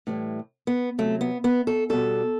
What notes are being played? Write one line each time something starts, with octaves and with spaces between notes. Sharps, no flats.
A2 E3 G3
B3
C3 F#3 A3
B3
B3
A4
B2 G3 A4